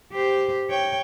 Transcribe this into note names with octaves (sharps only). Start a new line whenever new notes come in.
G4 C5
C#5 G5